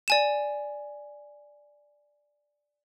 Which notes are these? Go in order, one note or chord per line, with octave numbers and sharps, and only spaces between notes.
D5 G#5 E7